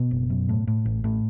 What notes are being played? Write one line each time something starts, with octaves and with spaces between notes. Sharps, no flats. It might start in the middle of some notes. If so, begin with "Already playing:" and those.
Already playing: B2 B3
F#1
F#2
A2
A2
A1
A2